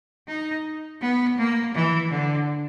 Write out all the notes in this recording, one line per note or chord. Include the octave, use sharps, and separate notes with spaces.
D#4
B3
A#3
E3
D3